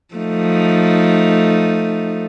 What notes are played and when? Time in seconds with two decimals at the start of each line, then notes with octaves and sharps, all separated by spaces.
0.15 F3 A3 D#4